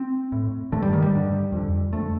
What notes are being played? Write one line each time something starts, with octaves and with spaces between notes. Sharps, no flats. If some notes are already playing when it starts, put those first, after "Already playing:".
Already playing: C4
A2
G2 D3 A3
G3
D#3
G3
G2 D3
F2 D3
F2 D3 A3